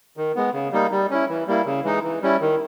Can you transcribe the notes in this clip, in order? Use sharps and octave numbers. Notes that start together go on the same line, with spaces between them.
D#3
G#3 B3
C#3
G3 A#3 D#4
G3
C#4 E4
E3
G3 A#3 E4
C#3
E3 G#3 D#4
E3
G3 C#4 E4
D#3